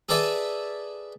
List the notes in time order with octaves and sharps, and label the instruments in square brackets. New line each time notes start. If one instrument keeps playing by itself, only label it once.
[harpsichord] G#4 A4 B4 D5 E5 G#5